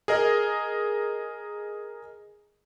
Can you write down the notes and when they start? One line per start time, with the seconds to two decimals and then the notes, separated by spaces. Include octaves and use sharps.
0.08 G#4 A#4 D#5